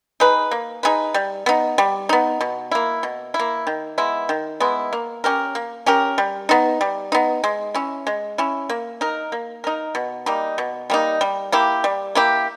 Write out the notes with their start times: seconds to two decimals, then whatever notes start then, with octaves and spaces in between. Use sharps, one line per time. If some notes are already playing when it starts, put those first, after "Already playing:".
0.20 D#4 G#4 B4
0.51 A#3
0.83 D#4 G#4 B4
1.14 G3
1.46 B3 D#4
1.78 G3
2.09 B3 D#4
2.41 B2
2.71 A#3 E4
3.03 B2
3.34 E4
3.39 A#3
3.67 D#3
3.98 G#3 B3 E4
4.29 D#3
4.60 G#3 B3 E4
4.93 A#3
5.24 C#4 G4 A#4
5.55 A#3
5.86 C#4 G4 A#4
6.18 G3
6.49 B3 D#4
6.81 G3
7.12 B3 D#4
7.44 G#3
7.74 C#4 E4
8.07 G#3
8.38 C#4 E4
8.69 A#3
9.01 D#4 A#4
9.32 A#3
9.64 D#4 A#4
9.95 B2
10.26 G3 A#3 D#4
10.58 B2
10.90 G3 A#3 D#4
11.21 G3
11.52 A#3 E4 G4
11.84 G3
12.15 A#3 E4 G4